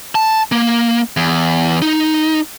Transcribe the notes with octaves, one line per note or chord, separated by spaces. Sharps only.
A5
A#3
E2
D#4